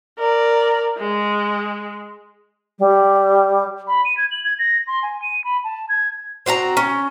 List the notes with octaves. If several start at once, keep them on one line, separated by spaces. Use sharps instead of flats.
A#4 D5
G#3
G3
B5
D#7
G#6
F#7
G#6
A#6
C6
G#5
D#7
B5
A5
G#6
C4 F#4 G#4 A#5
C#4